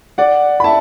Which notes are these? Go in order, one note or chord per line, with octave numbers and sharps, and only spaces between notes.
D5 F#5
B5
E5 A5